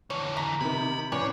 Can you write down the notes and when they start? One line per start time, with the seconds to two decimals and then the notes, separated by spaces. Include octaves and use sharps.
0.10 D3 E3 C#5
0.37 A#5 B6
0.61 C3 D#3 B5
1.12 A2 E3 C#4 C#5 D5